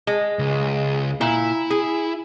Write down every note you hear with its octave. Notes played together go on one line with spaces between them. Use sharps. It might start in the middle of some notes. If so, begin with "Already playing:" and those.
G#3
C#2
A#2 E4
G#4